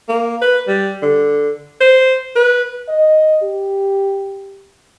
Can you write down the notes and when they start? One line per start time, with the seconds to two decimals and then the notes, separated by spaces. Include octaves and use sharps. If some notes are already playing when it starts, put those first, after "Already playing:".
0.09 A#3
0.42 B4
0.68 G3
1.02 D3
1.81 C5
2.36 B4
2.89 D#5
3.42 G4